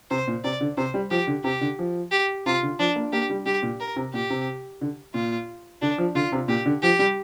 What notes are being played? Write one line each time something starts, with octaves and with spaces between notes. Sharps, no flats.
C3 C5
A#2
C3 D5
D3
C3 C5
G3
F3 G4
D3
C3 G4
D3
F3
G4
C3 F4
D3
F3 D4
A#3
A#3 G4
G3
G3 G4
A#2
A#4
C3
A#2 G4
C3
D3
A#2 F4
D3 D4
F3
D3 F4
C3
A#2 G4
D3
F3 G4
G3